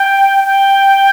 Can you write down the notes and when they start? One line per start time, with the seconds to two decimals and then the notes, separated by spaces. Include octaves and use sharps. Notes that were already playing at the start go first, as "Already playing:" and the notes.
Already playing: G5
0.46 G5